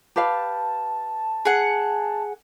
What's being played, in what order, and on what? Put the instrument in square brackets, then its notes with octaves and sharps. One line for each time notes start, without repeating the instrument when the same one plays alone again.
[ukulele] G4 B4 F5 [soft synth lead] A5
[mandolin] G#4 F#5